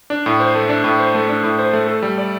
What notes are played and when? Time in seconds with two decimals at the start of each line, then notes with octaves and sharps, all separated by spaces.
0.10 D4
0.26 A2
0.40 C5
0.55 A3
0.69 D4
0.84 A2
0.99 C5
1.15 A3
1.29 D4
1.44 A2
1.59 C5
1.73 A3
1.87 A4
2.02 G3
2.18 D5